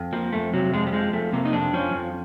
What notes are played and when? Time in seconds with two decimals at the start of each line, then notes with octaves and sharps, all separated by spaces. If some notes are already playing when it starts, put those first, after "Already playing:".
Already playing: F2
0.13 F3 A#3
0.33 F2 A3
0.54 C3 F#3
0.73 F2 G#3
0.87 G3
0.93 F3 G#3
1.13 F2 A3
1.33 C3 A#3
1.45 D#4
1.53 F2 D4
1.73 F3 C#4
1.94 F2